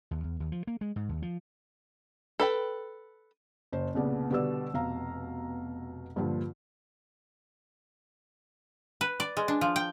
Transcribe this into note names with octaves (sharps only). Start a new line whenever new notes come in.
D#2
E2
D#2
F3
A#3
G#3
G#2
D#2
F3
A4 B4 G5
F#1 C5
C2 A#2 C#3 B3 D5
B2 D3 G3 B4 D5 E6
F1 B2 F5 A#5
G2 A#2 D3 F3 G3
B4
D5
G#3
D4
F3
G5